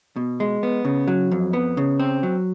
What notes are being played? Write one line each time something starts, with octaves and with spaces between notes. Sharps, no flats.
B2
G#3
B3
C#3
F#3
F2
B3
C#3
C4
F#3